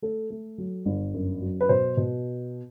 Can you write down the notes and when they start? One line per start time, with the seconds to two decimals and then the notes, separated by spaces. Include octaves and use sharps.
0.02 A3 A4
0.30 A3
0.58 F#3
0.85 G1
1.14 F#2
1.41 F#3
1.61 B4
1.69 B2 C5
1.97 B2